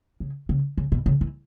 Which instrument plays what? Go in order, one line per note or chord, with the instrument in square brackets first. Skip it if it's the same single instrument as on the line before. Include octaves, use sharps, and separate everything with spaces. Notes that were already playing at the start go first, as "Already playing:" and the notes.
[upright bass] C#3
C#3
C#3
B2
C#3
E3